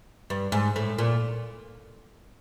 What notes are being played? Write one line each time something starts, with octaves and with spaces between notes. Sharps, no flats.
G2
G#2
A2
A#2